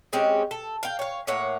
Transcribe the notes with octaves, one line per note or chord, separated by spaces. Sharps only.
G#3 C4 C#4 G4
A4
F5 G5
C#5 F5
A2 A#3 C#5 F#5